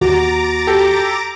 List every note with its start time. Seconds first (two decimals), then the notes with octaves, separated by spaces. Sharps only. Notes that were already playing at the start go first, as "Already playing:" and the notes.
0.01 D#2 F#4 A#5 D6 A6
0.67 G4 A4